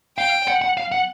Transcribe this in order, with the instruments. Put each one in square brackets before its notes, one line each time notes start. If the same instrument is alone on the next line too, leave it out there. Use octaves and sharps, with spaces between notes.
[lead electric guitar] F5 [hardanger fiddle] G5
[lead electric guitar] F#5
F#5
F5
F#5